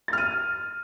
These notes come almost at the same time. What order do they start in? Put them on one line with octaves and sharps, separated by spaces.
A6 F6 D#7